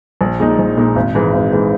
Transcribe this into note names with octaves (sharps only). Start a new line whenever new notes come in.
A#1
A#2 G#3 D#4
A#1
A#2 G#3 D#4
G#1
G#2 E3 G#3
G#1
G#2 E3 G#3